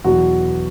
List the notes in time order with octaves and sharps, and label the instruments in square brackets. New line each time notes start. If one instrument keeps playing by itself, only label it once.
[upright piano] E2 B2 F#3 F#4